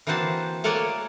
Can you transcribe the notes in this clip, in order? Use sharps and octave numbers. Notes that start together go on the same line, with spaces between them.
E3 A#3 C4 F#4 C5 A5
A3 A#3 C#5 D5 F#5 G#5